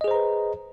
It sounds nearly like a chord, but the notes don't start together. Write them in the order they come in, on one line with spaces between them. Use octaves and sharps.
D#5 G#4 C5 A#5 B4